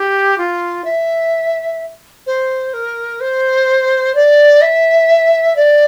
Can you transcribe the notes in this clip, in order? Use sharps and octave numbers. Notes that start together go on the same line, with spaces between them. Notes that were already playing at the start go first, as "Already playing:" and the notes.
Already playing: G4
F4
E5
C5
A#4
C5
D5
E5
D5